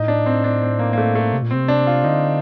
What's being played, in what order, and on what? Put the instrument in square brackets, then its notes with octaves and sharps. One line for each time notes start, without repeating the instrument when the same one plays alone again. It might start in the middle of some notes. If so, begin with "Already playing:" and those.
Already playing: [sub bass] A2 [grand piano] D#4
[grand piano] D4
C4
D4
C4
A#3
A#3
A3
A3
[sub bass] C3
A#2
[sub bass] C3 [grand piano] C4
[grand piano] D4
F4
[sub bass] D3 [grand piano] D#4